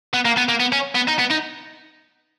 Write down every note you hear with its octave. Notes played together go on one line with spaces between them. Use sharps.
B3
A#3
B3
A#3
B3
C#4
B3
D#4
B3
D#4